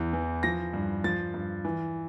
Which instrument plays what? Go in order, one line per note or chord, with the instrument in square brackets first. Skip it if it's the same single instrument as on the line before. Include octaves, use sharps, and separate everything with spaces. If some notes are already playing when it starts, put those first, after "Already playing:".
Already playing: [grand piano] E2 E3
E3
F3 A#6
G2
F3 A6
G2
E3